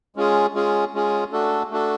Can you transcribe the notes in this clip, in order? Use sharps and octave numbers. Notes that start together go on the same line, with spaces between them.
G#3 C#4 F4 G#4
G#3 C#4 F4 G#4
G#3 C#4 F4 G#4
A3 D4 F#4 A4
A3 D4 F#4 A4